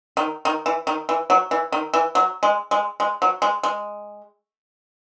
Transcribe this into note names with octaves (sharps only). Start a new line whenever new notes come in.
D#3
D#3
E3
D#3
E3
F#3
E3
D#3
E3
F#3
G#3
G#3
G#3
F#3
G#3
G#3